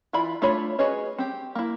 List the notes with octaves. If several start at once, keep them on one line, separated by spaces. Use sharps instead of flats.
E3 E4 F4 D5 B5
A3 D4 F4 C#5 B5
F#4 G#4 B4 C#5 D#5
C4 G4
A#3 E4